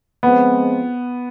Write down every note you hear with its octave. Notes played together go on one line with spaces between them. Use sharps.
F3 G#3 B3 C4